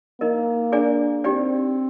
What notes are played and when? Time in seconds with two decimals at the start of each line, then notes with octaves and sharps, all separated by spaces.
0.21 A#3 D#4 A#4 D#5
0.72 D4 G#4 D5 G#5
1.24 C4 D#4 G4 D5 G5